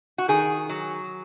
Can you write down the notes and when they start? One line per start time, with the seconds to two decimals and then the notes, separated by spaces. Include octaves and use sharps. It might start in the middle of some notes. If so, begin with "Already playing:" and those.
0.18 F#4
0.28 D#3 G#4
0.69 F#3